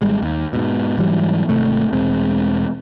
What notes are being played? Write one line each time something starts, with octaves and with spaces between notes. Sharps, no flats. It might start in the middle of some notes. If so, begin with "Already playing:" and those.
G#1 G3 G#3
D#2
G#2 B2
G#2 E3 F#3 G3
G#1 C3 A3
E1 G#3 C4